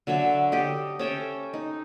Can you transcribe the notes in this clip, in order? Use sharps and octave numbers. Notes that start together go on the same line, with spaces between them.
D3 F#3 D4 E5
G4 A4 D#5
C#4 A4 E5 G5
D#4